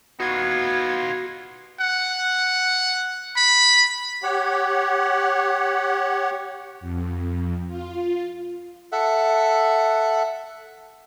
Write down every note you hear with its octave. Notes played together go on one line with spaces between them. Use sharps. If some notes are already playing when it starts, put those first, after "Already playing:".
B3 D#4 F4 F#4 G#6
F#5
B5
G4 C#5 F#5
F2
F4
A4 E5 F#5